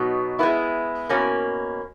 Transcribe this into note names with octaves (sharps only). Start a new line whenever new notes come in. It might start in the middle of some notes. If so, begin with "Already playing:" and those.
Already playing: B2 F#3 B3 D#4
G#3 B3 E4
B2 A#3 C#4 F#4